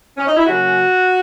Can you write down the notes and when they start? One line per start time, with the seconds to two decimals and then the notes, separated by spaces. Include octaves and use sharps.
0.18 C#4
0.27 D#4
0.37 E4
0.47 C#3 F#3 A#3 C#4 F#4